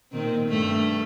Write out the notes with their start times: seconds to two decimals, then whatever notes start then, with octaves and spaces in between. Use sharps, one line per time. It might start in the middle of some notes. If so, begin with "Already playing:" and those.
0.12 A#2 D#3 C4
0.48 G2 A3